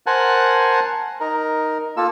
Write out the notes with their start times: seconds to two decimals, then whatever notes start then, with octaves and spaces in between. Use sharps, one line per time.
0.06 A#4 C5 F#5 G#5 A5 F#6
1.20 D#4 A#4
1.97 A#3 F4 A4 E6